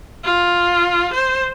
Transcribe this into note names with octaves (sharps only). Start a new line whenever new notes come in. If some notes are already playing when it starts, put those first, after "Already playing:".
F4
C5